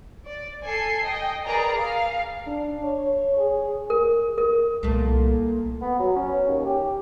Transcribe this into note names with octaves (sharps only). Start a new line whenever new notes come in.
D5
A4 G#5 C7
D#5 G5
G#4 A#4 B4 D5 A#5
F5
D4
C#5
G#4
A#4
A#4
C2 A#2 A3
B3
F#3
C#4
D#2
G4